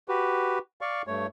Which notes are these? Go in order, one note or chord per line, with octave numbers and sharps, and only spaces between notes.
F#4 G4 B4
D5 F5 C#6
G2 A3 C#5